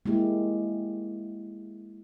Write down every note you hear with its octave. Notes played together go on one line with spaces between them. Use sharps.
G#3 A#3 E4 G4